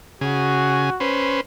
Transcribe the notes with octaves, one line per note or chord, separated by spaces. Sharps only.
C#3 F#4 G#4
C#4 B4 C5